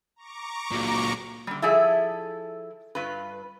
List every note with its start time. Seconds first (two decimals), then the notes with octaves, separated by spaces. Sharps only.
0.16 A#5 C#6 D6
0.71 A#2 F#3
1.47 D3 G3
1.62 F3 E4 G#4 A4 D5 E5
2.95 G2 F4 B4